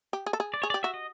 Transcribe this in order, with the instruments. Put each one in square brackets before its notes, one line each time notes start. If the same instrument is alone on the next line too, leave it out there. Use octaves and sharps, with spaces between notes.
[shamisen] G4
G#4
A4
G#4
[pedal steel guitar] D5
[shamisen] G#4 [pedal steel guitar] C#5
[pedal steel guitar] D5
[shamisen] G4
[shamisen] F#4 [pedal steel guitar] E5
[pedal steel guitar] D#5